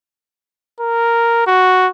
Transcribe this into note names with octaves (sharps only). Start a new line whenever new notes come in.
A#4
F#4